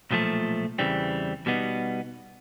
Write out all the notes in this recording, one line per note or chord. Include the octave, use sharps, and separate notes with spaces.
B1 A#2 F3 A3
E2 C#3 E3 G3 C4
B2 G3 B3 D#4